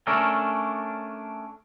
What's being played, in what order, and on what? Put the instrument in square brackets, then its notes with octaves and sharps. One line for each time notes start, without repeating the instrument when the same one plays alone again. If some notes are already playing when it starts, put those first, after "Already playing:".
[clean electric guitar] A3 C#4 D4 A4 A#4